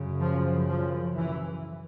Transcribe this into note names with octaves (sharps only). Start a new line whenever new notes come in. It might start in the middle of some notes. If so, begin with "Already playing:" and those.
Already playing: F#2 C#3
F3
F3
E3